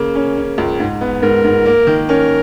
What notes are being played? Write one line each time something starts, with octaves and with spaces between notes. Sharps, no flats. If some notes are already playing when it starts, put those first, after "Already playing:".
Already playing: C#3 A#3
C#4
C#4
C#2
G#2
B3
G#2 A#4
G#2
A#3
D#3
C#4 A#4